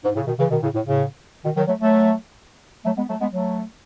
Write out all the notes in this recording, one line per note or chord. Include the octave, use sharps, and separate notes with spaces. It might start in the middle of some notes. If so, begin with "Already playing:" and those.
G#2
A2 C#3
B2 D#3
C#3 E3
B2 D#3
A2 C#3
A2
A2 C#3
B2 D#3
D#3 F#3
F#3 A3
F#3 A3
F#3 A3
G#3 B3
F#3 A3
G#3 B3
F#3 A3